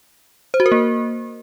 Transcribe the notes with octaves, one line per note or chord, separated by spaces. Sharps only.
C5
F#4
A#4
A#3